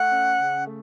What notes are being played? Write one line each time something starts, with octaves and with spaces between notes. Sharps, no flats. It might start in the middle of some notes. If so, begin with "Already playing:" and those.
Already playing: A3 F#5
C#4
C#3
A3